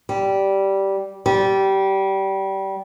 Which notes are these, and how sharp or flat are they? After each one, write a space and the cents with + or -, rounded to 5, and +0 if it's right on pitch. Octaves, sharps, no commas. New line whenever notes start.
G3 -10
G3 -20